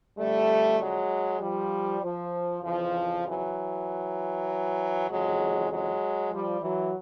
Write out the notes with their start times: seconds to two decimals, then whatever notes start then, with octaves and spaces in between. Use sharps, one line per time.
0.17 F2 D3 G3 A3
0.79 F#3 G#3
1.40 F3 G3
2.02 F3
2.63 F2 C#3 E3 F3
3.24 E3 F#3
5.08 F2 C#3 E3 F#3 G#3
5.69 F#3 G#3
6.31 F3 G3
6.61 E3 F#3